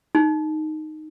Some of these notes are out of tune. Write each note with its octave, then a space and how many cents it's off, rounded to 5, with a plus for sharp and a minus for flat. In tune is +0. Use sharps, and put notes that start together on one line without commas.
D#4 -5